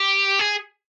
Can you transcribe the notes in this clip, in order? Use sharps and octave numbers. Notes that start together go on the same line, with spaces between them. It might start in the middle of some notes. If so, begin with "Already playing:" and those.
Already playing: G4
G#4